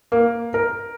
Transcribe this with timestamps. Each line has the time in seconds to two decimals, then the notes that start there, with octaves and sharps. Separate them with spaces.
0.12 A#3
0.54 A#4